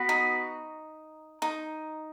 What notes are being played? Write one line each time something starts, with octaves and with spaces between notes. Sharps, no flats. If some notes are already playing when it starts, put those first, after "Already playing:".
Already playing: B3 F#4 B4
D#4
D#4